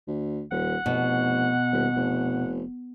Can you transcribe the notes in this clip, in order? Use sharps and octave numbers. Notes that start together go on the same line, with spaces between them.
D2
D#1 F#5
F1 B2
D#1
F1